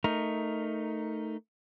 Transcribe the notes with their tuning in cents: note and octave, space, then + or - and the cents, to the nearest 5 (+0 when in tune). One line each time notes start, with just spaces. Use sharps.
A3 +10 D#4 +0 A#4 +0